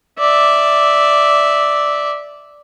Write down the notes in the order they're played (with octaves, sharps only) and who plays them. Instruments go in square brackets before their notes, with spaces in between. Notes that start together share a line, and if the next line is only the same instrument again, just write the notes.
[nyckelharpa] D5 E5